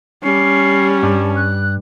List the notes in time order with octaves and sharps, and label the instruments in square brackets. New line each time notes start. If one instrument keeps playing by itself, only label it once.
[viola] G3 [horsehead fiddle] C#4 [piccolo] C7
[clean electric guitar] G2 [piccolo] A5
[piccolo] F#6